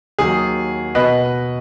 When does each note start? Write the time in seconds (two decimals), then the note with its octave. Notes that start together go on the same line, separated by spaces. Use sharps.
0.19 D#2 D#3 F#3 G#4
0.95 B2 B4 D#5